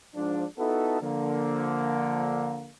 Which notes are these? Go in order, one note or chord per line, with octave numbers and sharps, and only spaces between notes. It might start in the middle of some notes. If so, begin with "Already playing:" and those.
G#2 F3 D4
B3 D#4 E4 F#4 A4
D3 F3 A#3